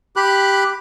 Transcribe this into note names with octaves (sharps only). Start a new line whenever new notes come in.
G4 B5 F#6